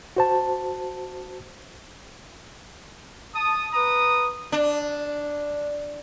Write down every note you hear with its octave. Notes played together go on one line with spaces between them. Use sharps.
F#4 C5 A5
A5 D#6
B4 A#5 D#6
D4